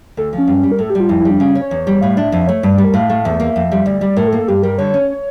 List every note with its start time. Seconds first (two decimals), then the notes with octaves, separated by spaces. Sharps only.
0.17 D2 A4
0.33 F3
0.38 C#4
0.48 G2
0.63 G3
0.72 A#4
0.79 A2 A4
0.90 G4
0.95 G3
1.00 F4
1.09 F2 E4
1.20 E4
1.25 G3
1.30 D4
1.40 C#3 C#4
1.55 C#4
1.61 C#5
1.71 E2
1.87 G3
2.02 A2 F5
2.17 D4 E5
2.32 F2 E5
2.47 A3 C#5
2.63 G2 D5
2.74 G3 D5
2.84 A#4
2.94 A2 F5
3.09 A3 F5
3.25 E2 E5
3.40 A#3
3.56 F2
3.72 G3
3.86 D2 D5
4.01 G3 D5
4.16 A2 A#4
4.28 A4
4.32 A#3
4.38 A4
4.48 G2 G4
4.63 G3 A#4
4.78 D3 C#5
4.94 C#4